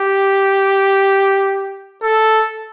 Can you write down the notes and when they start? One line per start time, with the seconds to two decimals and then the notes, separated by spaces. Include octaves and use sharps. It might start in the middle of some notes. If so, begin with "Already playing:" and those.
Already playing: G4
2.03 A4